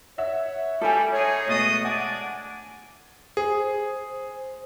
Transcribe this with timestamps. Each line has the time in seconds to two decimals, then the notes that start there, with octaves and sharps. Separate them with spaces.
0.18 C#5 E5 F#5
0.81 G3 A4 G#5
1.13 D#4 G#4 C#5
1.48 B2 G#3 A3 F#4 D#5 D#6 A6
1.85 D4 D5 F#5 G#5
3.37 G#4 C5